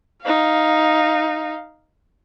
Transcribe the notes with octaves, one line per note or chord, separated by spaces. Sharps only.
D#4 F5